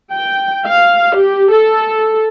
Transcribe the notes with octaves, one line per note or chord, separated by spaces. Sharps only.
G5
F5
G4
A4